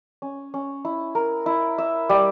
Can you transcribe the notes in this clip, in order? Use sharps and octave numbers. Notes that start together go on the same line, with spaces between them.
C#4
C#4
E4
A#4
E4
E5
G3